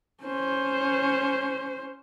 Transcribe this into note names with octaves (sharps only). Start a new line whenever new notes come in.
C#4 C5